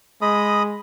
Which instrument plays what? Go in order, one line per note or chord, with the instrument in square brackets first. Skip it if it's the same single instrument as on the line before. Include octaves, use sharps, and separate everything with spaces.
[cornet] G#3 [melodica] D#5 B5 D#6